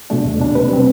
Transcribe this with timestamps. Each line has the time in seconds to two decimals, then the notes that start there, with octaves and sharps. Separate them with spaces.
0.10 B2 A3 D4
0.25 E2
0.40 B2 A3 D4
0.55 C3 B4
0.71 G3 C4